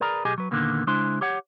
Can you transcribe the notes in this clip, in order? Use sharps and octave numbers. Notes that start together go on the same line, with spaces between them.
G#4 A#4 B4 D5 A#5
B1 G4 G#4 D#5 G#5
F#3 B4
D#2 A#2 D3 D#3 A#3 B3
C#3 G#3 D4 E4 C5 C6
G4 C#5 F#5